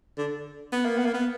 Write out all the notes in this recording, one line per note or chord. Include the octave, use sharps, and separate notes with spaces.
D3
B3
A#3
B3
A#3
B3